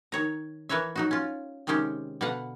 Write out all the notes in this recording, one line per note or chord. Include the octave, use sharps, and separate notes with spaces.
D#3 C#5 A#5
E3 A#4 B4 C#5 E5
F#3 D#4 F#4
C#4 F4
C3 D#3 G#3 C#4 G4
B2 D3 B4 F5 F#5